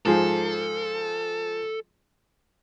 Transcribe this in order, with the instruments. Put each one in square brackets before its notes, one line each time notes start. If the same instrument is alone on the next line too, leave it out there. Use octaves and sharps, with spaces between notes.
[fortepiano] G#2 F3 G#4 [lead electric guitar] A4